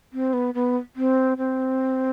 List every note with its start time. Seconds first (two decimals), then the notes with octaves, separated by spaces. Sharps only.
0.13 C4
0.33 B3
0.54 B3
0.96 C4
1.38 C4